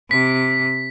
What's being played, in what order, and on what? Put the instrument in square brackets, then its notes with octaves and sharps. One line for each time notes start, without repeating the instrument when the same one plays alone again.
[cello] C3 [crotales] B6